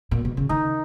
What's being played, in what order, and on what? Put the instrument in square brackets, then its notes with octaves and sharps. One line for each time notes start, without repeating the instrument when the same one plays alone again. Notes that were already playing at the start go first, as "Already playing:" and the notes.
[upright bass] A#2
B2
C#3
[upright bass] D#3 [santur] D#4